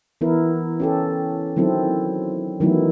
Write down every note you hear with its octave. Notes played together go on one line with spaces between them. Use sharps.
E3 B3 E4 A#4
C#4 G4 A4
D#3 F#3 C4 E4 A4
D#3 E3 F#3 A3 B3 E4